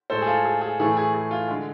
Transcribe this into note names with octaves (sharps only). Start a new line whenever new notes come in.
A2 G#3 A4 C5
G#4
F4 A4
G#4
G#4
A2 E3 A3 G#4
G#4
G#4
F4
D3 G#3